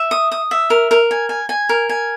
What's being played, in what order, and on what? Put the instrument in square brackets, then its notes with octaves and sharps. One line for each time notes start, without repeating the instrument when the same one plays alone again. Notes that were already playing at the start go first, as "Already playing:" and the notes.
Already playing: [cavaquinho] E5
D#6
D#6
E5
A#4
A#4
G#5
G#5
G#5
A#4
G#5